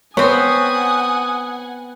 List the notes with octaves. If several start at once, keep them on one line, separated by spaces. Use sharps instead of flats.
B3 C4 C#5 F#5 G#5 D#6